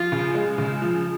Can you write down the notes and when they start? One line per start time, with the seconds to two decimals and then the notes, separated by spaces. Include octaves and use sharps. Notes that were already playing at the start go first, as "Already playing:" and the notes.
Already playing: F3 F4
0.12 C#3
0.34 G#3
0.58 C#3
0.82 F3